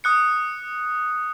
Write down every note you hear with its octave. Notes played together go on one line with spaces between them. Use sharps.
D#6 F#6 C#7